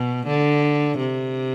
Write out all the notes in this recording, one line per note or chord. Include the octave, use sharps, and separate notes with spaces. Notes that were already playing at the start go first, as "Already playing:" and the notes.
Already playing: B2
D3
C3